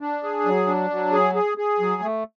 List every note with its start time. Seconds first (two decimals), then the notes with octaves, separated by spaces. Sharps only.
0.01 D4
0.23 G#4
0.45 F#3
0.67 D4
0.90 F#3
1.12 G#4
1.35 G#4
1.58 G#4
1.80 F#3
2.02 A3